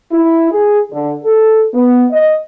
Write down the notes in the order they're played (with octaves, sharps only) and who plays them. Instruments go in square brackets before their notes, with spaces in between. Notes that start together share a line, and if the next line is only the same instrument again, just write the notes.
[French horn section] E4
G#4
D3
A4
B3
D#5